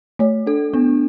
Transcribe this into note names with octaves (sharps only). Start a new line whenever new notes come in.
A3 C#5
D4 A4
B3 D4